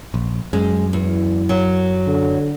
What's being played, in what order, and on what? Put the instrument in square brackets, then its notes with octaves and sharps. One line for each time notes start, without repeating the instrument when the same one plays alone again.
[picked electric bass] A#1
[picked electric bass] F#2 [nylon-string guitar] G#3
[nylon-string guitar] E2
F#3
[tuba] D3